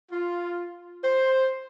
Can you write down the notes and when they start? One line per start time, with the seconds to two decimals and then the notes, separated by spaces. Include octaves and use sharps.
0.12 F4
1.04 C5